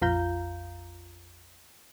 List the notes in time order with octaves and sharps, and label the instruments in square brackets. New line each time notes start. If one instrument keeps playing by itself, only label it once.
[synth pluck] A#1 F2 F4 F5 A#5 G6